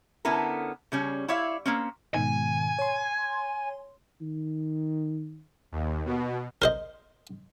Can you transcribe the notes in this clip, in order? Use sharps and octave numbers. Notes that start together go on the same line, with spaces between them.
D3 B3 C#4 E4 A4 A#4
C#3 G3 C#4
E4 C#5 D5 E5 F5
A#3 C4 C#4
G#2 B2 D#3 G#5
C#5 C6
D#3
D#2
B2
A#4 C5 D#5